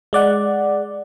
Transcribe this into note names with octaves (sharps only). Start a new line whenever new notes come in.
G#3 D5 F#5